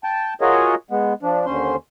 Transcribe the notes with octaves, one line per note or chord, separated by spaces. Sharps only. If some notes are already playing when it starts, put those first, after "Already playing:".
G5 A5
F4 F#4 G#4 A#4 C#5 D#5
G#3 B3
F3 D4
D#2 D3 C#4 C5 C6